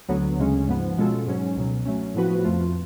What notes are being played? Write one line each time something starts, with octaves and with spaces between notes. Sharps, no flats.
D2 D3 F#3 B3
D2 C#3 G#3 C#4
G#2 F3 B3
B2 G#3 C#4 F4 A4
G#2 F#3 C#4
C#2 B2 F#3
F#3 A3 C#4
A2 F3 B3 F#4 B4
F2 F3 A3 F4